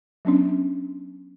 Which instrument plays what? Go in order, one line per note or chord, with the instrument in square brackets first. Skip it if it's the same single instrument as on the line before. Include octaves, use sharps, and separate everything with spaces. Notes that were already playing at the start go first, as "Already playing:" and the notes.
[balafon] F#3 B3 C#4 D4